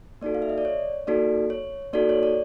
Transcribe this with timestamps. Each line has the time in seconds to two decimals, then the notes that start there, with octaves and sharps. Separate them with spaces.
0.21 A#3 D#4 F#4 A4 D5
0.35 F5
0.42 E5
0.49 D#5
0.58 D5
0.65 C#5
1.07 A#3 D#4 F#4 A4 D5
1.50 C#5
1.93 A#3 D#4 F#4 A4 D5
2.09 C#5
2.23 D5